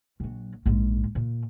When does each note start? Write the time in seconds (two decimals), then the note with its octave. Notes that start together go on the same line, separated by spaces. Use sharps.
0.20 A#1 F#3
0.66 A#1 G#2
1.15 A#2